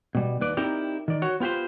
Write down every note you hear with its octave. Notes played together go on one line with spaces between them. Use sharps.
B2 G3
D#2 B4 D5
C4 D#4 E4 G4 A#4 D5
D#3 D5
F#4 C#5
B3 F4 G4 B4 C5